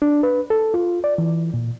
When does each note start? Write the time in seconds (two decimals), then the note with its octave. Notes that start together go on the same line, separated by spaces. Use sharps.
0.02 D4
0.23 B4
0.50 A4
0.74 F4
1.04 D5
1.18 E3
1.54 A#2